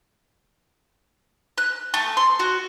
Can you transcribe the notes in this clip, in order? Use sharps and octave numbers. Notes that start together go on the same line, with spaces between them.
F#6
A3
C6
F#4